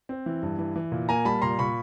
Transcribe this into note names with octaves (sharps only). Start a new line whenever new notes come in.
C4
E3
G2
E3
E3
A#2
A#3 G#5 A#5
G3 A5 B5
A#2 A#5 C6
A#2 B5 C#6